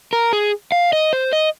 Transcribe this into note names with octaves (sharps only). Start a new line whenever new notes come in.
A#4
G#4
F5
D#5
C5
D#5